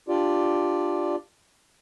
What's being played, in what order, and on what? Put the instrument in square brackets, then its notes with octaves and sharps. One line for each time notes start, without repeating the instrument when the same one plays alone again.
[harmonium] D4 F4 G4 D5